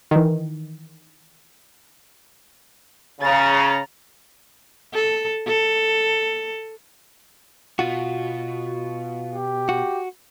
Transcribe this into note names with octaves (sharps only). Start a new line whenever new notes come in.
D#3 E3
C#3 A#5 A6
A4
A4
B2 F4 F#4
G4
F#4